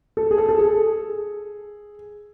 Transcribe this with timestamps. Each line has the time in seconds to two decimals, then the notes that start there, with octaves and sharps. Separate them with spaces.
0.17 A4
0.31 G#4
0.38 A4
0.49 A4
0.59 G#4